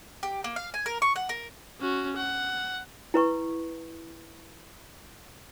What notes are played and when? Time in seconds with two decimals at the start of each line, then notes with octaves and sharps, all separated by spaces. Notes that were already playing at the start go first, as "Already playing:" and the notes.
0.23 G4
0.44 A#3
0.56 F5
0.74 G#5
0.86 A#4
1.02 C#6
1.16 F#5
1.29 A#4
1.80 C#4 F#4
2.16 F#5
3.14 E4 B4 C#6